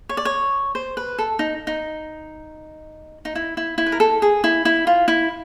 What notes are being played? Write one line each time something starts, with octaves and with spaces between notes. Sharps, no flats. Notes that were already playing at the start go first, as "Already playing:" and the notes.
C#5
D5
C#5
C5
B4
A4
D#4
D#4
D#4
E4
E4
E4
B4
A#4
A4
G#4
E4
E4
F4
E4